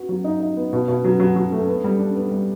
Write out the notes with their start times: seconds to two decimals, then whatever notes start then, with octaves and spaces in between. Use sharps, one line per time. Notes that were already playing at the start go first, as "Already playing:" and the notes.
Already playing: B3 F#4
0.09 F#3
0.24 D#4
0.40 D#4
0.57 B3
0.73 B2
0.88 B2
1.04 F#3
1.20 F#3
1.36 F#3
1.52 A3
1.68 B3
1.84 G3
1.99 D4
2.15 B3
2.32 G3